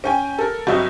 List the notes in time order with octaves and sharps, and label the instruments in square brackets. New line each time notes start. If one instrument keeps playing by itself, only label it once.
[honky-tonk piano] C#4 G5 G#5
A4 A#4
G1 F#3 C4 F#4 D#5 E5